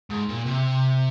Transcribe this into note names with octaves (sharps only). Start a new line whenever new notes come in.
G#2
A#2
C3